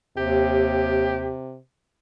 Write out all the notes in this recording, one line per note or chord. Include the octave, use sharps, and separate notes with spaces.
D#2 C3 G4